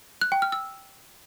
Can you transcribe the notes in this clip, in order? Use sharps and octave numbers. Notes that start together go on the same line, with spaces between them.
F#6
G5
F6
E6